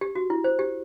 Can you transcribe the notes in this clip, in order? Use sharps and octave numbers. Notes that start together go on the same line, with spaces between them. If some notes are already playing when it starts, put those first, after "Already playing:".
G4
F#4
E4
C5
G4